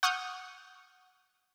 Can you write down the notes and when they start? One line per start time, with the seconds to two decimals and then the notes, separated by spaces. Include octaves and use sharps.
0.03 F#5 C#6 D#6 F6 G6